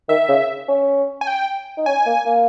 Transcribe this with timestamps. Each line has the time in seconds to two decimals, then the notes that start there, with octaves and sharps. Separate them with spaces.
0.09 D#3 E5
0.29 C#3
0.68 C#4
1.21 G#5
1.27 G5
1.77 D#4
1.86 C#4 G#5
2.06 A#3
2.26 A#3